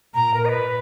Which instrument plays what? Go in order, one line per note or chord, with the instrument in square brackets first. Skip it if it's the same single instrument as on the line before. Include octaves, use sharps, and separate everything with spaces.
[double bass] A#2 [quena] A#5
[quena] A#4
D#5
B4